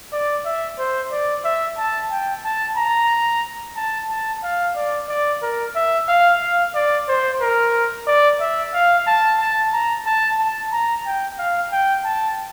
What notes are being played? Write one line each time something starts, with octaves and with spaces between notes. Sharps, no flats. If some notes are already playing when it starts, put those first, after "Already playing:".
D5
E5
C5
D5
E5
A5
G5
A5
A#5
A5
A5
F5
D5
D5
A#4
E5
F5
F5
D5
C5
A#4
D5
E5
F5
A5
A5
A#5
A5
A5
A#5
G5
F5
G5
A5